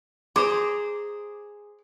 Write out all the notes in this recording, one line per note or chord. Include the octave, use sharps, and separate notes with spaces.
G#4 C5 A#5 D6